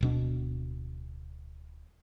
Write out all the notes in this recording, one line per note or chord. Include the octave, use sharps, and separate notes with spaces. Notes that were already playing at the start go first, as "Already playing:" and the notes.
D1 B2 D4